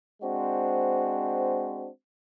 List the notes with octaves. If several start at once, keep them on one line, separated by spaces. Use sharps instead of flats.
G#3 C4 D4 F#4 C5